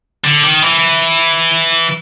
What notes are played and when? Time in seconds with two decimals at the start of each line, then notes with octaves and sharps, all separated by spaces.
0.24 D3
0.43 D#3
0.62 E3